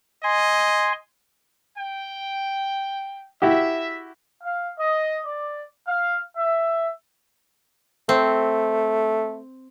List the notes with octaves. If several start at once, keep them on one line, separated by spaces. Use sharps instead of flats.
D#5 G#5 C6
G5
E4 F#4 G4 E5
F5
D#5
D5
F5
E5
A3 C4